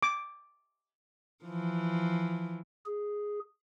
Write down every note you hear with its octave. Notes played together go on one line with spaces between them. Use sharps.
D6
E3 F3
G#4